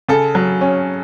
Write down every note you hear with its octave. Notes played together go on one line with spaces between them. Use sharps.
C#3 A4
F#3
C#4